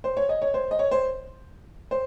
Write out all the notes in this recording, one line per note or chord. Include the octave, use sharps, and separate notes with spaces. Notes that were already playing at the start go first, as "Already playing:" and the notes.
C5
C#5
D#5
C#5
C5
D#5
C#5
C5
C5